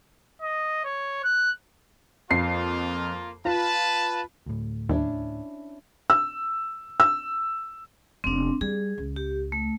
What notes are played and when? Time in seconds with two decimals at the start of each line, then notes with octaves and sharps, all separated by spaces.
0.42 D#5
0.85 C#5
1.24 F#6
2.30 F2 A#3 F4 C7
3.45 F4 B4 A5
4.46 D2 A2
4.89 D#2 C#4 D4 E4
6.10 E6
7.00 E6
8.24 F1 B3 C4 D4
8.61 G3 G#4
8.98 C#2
9.16 G4
9.52 A3